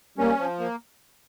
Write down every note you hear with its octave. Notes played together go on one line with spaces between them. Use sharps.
G3 A#3 C#4
F3
A#3